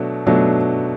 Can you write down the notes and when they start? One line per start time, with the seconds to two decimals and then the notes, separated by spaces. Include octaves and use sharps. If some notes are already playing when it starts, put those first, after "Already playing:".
Already playing: B2 F#3 A3 D4
0.26 B2 F#3 A3 D4